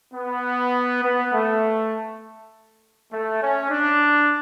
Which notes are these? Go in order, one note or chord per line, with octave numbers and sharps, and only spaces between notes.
B3
B3
A3
A3
C#4
D4